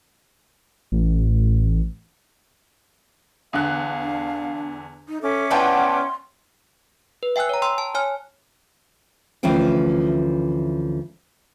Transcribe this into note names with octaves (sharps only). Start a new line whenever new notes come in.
A1
E2 D3 F5 F#6
D4
D#4
C#4 A4 E5 D6
E3 B3 D4 F#5 G5 A5 C6
B4
E5 G5 G#5 E6 F#6
C#5 A#5
G5 A#5 C6 E6
A5
C#5 G#5 F6
D2 E3 F3 C#4 F4 G5